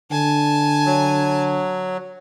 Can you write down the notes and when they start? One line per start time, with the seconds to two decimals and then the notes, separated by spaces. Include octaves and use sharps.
0.11 D3 G#5 A5
0.86 F#3